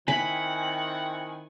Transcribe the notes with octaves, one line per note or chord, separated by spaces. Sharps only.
D#3 C4 E4 F#5 G#5 B5